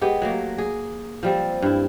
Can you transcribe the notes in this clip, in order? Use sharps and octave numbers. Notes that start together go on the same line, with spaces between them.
G#3 B3 G4 G#4
F#3 A3 A#3
G#4
F3 G3 C4
G2 E4